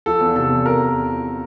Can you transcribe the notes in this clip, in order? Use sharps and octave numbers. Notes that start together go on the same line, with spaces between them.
F3 A4
E2
C3 A4
E2
F3 A#4